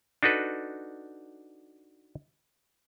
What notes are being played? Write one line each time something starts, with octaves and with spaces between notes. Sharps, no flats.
D4 D#4 F#4 A4 B4